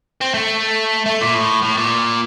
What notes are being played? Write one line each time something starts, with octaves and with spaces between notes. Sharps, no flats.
C4
A3
A3
A#2
A2
A2
A#2